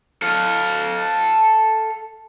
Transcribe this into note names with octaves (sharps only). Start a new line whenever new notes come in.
A4 F5